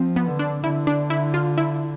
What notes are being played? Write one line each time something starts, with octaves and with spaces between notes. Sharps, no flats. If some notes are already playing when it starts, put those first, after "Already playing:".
Already playing: F3 C4
B3
D3
D4
D3 E4
D4
E4
F4
E4